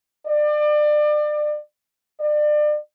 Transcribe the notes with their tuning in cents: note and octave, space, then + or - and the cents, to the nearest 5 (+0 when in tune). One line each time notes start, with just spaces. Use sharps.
D5 +30
D5 +35